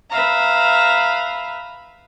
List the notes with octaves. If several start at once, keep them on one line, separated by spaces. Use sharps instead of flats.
B4 E5 F5 A#5